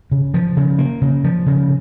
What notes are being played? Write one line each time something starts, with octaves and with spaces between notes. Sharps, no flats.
C#3
F3
C#3
A#3
C#3
F3
C#3